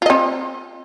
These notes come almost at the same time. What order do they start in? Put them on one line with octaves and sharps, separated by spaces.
F4 D#5 C4